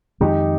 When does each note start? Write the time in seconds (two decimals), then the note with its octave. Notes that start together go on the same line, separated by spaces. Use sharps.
0.20 F2 D#3 G#3 C4 D#4 G4